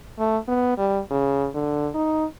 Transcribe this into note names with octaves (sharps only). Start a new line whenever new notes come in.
A3
B3
G3
C#3
D3
D#4